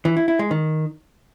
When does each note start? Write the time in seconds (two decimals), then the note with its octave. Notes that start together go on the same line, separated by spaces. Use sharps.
0.05 E3
0.17 E4
0.28 E4
0.39 G#3
0.51 D#3